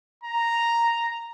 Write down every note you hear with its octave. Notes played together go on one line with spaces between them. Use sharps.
A#5